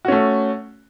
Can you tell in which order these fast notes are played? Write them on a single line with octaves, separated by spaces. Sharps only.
F#4 C#4 A3